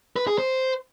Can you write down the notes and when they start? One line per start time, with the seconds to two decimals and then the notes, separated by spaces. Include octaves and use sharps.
0.16 B4
0.27 G#4
0.38 C5